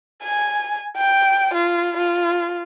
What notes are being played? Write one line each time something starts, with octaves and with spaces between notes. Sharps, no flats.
G#5
G5
F4
F4